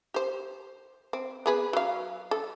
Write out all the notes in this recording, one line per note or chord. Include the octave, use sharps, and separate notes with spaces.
G4 C5
C4
B3 G#4 B4
F#3 F5
A4